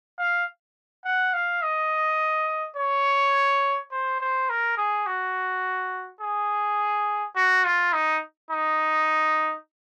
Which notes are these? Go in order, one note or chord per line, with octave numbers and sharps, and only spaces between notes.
F5
F#5
F5
D#5
C#5
C5
C5
A#4
G#4
F#4
G#4
F#4
F4
D#4
D#4